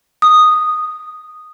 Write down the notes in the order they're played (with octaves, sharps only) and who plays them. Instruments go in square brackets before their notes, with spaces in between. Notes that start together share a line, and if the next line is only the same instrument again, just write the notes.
[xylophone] D#6